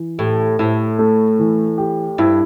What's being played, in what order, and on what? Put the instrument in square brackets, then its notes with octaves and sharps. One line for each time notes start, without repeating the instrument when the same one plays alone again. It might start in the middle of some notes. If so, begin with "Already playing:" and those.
Already playing: [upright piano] E3
[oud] A2 [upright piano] G4
[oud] A2 [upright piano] E4
[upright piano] A3
E3
G4
[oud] G2 [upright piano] E4